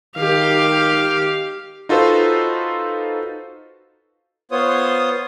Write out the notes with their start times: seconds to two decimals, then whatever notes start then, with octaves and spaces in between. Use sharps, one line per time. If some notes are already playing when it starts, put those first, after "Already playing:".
0.17 D#3 G4 F5
1.89 D#4 F4 F#4 A4 B4 C5
4.52 B3 F4 C5 C#5 D#6